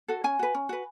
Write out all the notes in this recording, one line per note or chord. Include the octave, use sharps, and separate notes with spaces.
F#4 A4
C#4 G#5
F#4 B4
C#4
F#4 B4